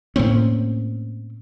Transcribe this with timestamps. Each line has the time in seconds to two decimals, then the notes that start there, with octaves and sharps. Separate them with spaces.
0.16 A2 A#3 C4 C#4